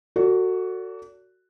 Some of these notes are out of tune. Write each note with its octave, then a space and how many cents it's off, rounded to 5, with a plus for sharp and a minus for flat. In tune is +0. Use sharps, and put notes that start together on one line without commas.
F#4 +0 A4 +35 D5 -40